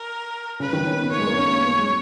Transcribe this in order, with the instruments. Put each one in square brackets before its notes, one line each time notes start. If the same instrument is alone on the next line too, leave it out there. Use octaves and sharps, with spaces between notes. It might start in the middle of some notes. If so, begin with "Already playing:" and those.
Already playing: [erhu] A#4
[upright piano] C#3 [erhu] B4
[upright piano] D#3
C#4
B3
[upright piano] A#3 [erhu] C#5
[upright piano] G#3
A#3
C#4
B3
G#3